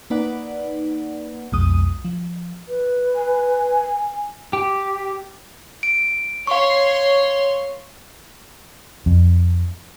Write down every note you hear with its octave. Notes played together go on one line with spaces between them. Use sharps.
A#3 D#4 B4 D5 F#5
B1 F2 G#3 D#6
F3
B4
G#5
G4
D7
C#5 F5 C6 C#6
F2